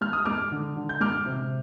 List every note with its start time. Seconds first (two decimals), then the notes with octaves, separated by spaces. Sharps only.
0.01 G#3 F6
0.13 D#6
0.25 G#3 D6 F6
0.52 D3
0.77 D3
0.89 G6
1.00 G#3 D6 F6
1.26 C3